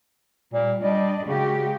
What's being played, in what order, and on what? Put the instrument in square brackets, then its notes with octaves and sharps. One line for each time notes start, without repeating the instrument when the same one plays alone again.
[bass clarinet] A#2 [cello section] G3
[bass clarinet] G3 [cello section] D4 D5 D#5
[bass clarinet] C#3 [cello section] G#3 F#4 G4